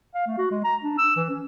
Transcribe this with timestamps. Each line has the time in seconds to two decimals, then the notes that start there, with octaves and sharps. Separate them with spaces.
0.15 F5
0.27 A3
0.38 F#4
0.51 G#3
0.64 A#5
0.83 D4
0.98 E6
1.16 E3
1.30 C#4